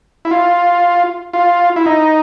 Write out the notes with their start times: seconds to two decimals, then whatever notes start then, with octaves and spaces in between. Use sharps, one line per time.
0.25 E4
0.31 F4
1.33 F4
1.76 E4
1.86 D#4